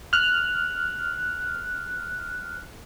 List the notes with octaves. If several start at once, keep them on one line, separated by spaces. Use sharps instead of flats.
F6 F#6